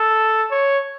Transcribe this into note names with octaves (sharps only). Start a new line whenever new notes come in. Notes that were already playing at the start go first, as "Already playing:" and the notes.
Already playing: A4
C#5